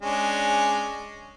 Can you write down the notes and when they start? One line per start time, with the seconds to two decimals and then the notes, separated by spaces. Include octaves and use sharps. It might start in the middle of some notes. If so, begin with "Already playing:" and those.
0.02 G#3 C#4 D4